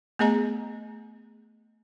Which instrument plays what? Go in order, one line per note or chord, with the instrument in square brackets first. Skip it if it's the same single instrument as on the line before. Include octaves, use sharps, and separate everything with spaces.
[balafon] A3 B3 G#4 D#5 A#5